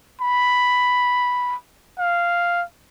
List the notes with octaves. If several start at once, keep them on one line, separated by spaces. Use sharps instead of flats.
B5
F5